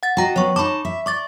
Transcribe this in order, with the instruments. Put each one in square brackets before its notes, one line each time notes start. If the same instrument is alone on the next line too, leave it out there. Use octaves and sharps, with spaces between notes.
[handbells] F#5 A6
[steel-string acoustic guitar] F#4 D#5 [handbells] G5 A#5 A#6
[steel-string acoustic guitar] F#3 B3 [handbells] C#5 C#6
[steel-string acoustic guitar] D#4 A5 [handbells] B5 C#6 D6
[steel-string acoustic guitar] E5
[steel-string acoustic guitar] D5 [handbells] C#6 D6 A6